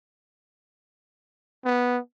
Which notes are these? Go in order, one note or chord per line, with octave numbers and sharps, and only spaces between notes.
B3